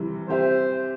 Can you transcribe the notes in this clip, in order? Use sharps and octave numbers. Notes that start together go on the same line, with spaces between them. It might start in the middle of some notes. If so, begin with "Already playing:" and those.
Already playing: C3 E3 G3
C4 G4 C5 E5